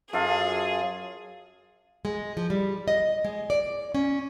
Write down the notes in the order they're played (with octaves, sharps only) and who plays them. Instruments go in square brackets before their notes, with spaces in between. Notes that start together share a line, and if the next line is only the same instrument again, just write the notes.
[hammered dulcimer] F#2 [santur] F4 A4 F5 [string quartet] G#4
[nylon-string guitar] G#3
F3
G3
D#5
G#3
D5
C#4